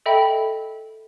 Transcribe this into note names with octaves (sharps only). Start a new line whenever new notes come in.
A4 D#5 E5 G5 B5